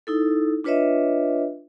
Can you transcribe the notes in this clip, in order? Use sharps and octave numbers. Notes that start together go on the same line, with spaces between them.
D#4 E4 A4
D4 F4 B4 C#5 D#5 E5